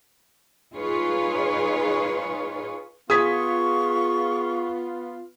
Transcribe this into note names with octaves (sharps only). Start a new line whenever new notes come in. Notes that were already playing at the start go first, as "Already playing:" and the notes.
D#4 F4 G#4 B4 C#5
B3 F4 G#4 C#6 D#6 G#6 B6